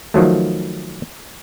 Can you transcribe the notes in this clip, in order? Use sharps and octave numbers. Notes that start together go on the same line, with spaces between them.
D#3 F3 F#3 A3